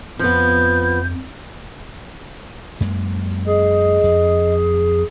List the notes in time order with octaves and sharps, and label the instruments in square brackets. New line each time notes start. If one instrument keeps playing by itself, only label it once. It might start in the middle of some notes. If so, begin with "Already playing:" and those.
[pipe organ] F2 [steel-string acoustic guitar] F3 B3 [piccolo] G6
[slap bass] F#2 G#3 A#3
[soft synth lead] G#4 [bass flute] D#5
[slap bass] F2